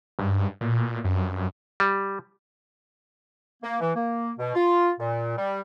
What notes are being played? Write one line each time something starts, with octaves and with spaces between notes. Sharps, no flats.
G2
A#2
F#2
G3
A#3
E3
A#3
B2
F4
A#2
G3